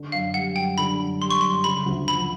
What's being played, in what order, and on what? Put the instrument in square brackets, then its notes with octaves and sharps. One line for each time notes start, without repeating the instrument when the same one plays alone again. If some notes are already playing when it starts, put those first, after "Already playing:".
Already playing: [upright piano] D3
[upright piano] F#2 [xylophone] F5
[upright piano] G3 [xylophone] F#5
[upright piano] F#2 [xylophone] G5
[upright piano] D3 [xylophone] B5
[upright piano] F#2
[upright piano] G3 [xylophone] C6
[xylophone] C#6
[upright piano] F#2 [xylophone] C6
[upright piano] C#3 [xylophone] B5
[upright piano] D2
[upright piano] F3 [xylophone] B5